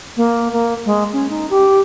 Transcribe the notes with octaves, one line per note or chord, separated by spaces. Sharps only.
A#3
A#3
G#3
C#4
D#4
G4